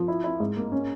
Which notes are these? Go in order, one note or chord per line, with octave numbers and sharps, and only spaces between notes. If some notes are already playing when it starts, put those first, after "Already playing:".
Already playing: F3
E4
E4
G#2
A#3
C#4